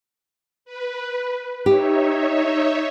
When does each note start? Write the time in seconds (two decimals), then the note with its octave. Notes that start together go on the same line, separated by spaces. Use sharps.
0.65 B4
1.66 D#4 G4 C#5 E5